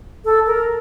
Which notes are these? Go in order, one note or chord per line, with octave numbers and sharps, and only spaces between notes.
A4
A#4